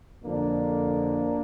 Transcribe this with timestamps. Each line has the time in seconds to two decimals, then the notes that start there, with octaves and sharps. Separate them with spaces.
0.23 F2 D3 F3 A#3 D4